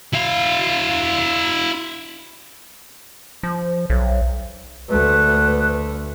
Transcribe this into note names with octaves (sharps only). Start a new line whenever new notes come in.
E4 F5
F3
B1
D2 A3 B4